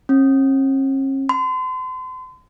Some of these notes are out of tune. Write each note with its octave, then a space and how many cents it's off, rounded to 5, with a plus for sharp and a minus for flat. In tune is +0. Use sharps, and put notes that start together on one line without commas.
C#4 -45
C6 -40